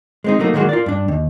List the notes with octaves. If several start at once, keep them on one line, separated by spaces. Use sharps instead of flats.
G#3 C4 D#4
F#3 A3 A#3 D#4
D#3 F#3 G#3 A#3 F#4
F4 A#4 D5
G2 D4
D#2